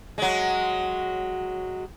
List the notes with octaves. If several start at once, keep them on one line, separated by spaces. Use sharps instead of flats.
F#3 G#3